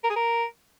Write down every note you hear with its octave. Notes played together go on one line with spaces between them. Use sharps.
A#4
G#4
A#4